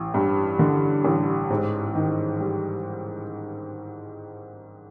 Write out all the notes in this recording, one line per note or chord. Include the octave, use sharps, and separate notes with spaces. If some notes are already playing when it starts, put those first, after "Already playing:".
Already playing: A1
G2
D3
A1
G#2
D#3
G3